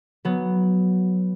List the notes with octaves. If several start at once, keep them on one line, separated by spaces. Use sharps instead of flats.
F#3 B3